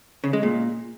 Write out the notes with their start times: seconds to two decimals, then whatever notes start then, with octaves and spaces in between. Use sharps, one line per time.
0.24 C#3
0.33 G#3
0.43 A#2